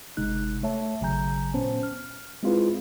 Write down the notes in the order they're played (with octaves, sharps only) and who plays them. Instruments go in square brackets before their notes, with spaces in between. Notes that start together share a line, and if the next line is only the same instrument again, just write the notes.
[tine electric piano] G1 C3 G#3 D#4 F#6
A3 C#5 E5 A5
G#1 C#3 F#3 G#5 A#5 G6
A#2 B3 C#4 C5 A5
F6
G#3 C4 E4 F4 G#4 B4